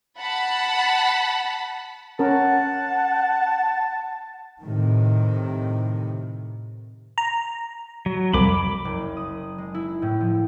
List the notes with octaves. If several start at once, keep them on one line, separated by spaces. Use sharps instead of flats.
F#5 A5 B5
C#4 A#4 F#5 A5
A2 C3 D#3
A#5
F#3
C2 F2 B5 D6
F#1
D#6
G#3
E4
A2
F3